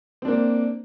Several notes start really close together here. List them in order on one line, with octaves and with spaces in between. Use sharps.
C4 D4 A#3